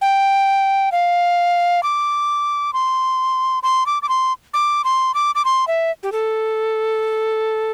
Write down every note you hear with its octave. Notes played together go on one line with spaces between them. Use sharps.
G5
F5
D6
C6
C6
D6
D6
C6
D6
C6
D6
D6
C6
E5
G4
A4